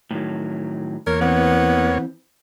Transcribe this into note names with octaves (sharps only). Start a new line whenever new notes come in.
A2 D#3 F#3
E2 A#3 A#4 C#5
E3 B3 C4